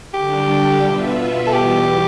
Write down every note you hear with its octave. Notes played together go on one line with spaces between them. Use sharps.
D3 G3 D4 G4
B2 B3 F4 B4 E5
A4
E2 B2 G3 G4